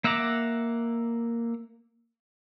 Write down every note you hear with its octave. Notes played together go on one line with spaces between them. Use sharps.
A#3 E5 F#5 A#5 D6